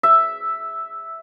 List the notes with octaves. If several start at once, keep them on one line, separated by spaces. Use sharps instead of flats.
E5